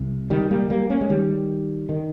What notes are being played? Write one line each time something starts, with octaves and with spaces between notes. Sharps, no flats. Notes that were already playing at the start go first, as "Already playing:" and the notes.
Already playing: C2 C3
D#3 G3
G3 A#3
G3 A#3
A#3 C#4
G#3
D#3 G3
D#3